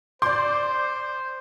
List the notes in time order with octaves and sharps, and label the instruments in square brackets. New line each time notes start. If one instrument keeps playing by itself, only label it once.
[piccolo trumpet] C5 [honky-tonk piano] D5 G6 [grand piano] C6 [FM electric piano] D6